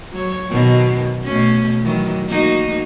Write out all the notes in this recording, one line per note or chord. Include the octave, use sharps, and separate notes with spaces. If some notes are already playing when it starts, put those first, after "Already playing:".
F#3 C#5
B2 D#3 F#3
B2 A3 C#4
D#3 E3 F#3
A#3 D#4 F#4